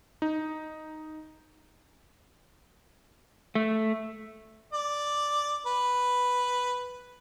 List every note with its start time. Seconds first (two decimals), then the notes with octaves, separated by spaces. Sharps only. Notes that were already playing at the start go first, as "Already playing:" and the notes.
0.22 D#4
3.55 A3
4.73 D5
5.66 B4